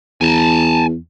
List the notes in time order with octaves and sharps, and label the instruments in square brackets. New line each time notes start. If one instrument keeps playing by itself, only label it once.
[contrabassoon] E2 [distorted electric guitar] G#5 A5